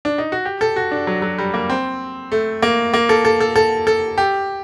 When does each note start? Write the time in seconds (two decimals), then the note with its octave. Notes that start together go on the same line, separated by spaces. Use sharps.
0.05 D4
0.18 D#4
0.32 F#4
0.45 G4
0.61 A4
0.76 F#4
0.91 D4
1.07 F#3
1.22 F#3
1.38 G3
1.54 A#3
1.70 C4
2.32 A3
2.62 A#3
2.94 A#3
3.09 A4
3.25 A4
3.40 A4
3.56 A4
3.87 A4
4.18 G4